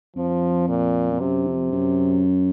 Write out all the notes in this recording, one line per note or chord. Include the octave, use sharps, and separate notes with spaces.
F2 F3
A#2
F2
F#2 C3
F2
F#2